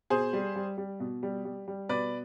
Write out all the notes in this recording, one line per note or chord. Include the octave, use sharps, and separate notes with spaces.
B2 G#4 C5
G3
G3
G3
B2
G3
G3
G3
B2 B4 D5